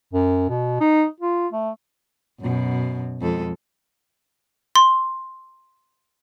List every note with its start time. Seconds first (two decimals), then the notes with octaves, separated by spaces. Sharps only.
0.13 F#2
0.49 B2
0.81 D#4
1.20 F4
1.53 A3
2.41 F#2 B2
3.21 F2 G#3 A4
4.76 C6